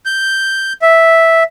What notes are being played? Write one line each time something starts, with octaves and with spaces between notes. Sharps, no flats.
G6
E5